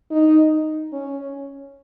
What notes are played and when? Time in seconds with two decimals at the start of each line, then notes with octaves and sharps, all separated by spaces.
0.11 D#4
0.93 C#4